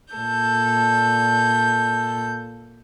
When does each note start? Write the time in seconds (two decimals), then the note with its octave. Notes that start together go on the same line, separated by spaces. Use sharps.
0.14 A#2 A4 G6